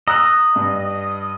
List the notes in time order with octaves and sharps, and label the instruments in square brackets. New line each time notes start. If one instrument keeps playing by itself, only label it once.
[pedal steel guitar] D#5 [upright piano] A#5 E6 F#6
[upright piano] G2